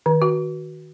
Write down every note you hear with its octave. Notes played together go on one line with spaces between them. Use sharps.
D#3
F#4